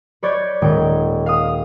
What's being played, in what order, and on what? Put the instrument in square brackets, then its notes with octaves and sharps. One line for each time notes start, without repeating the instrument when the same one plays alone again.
[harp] B4 C#5 D5 G6 G#6
D#1 G#3 G5
F5 D#6